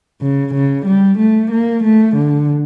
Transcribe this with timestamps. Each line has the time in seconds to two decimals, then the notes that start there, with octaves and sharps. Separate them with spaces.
0.21 C#3
0.54 C#3
0.86 G3
1.18 A3
1.51 A#3
1.83 A3
2.15 D3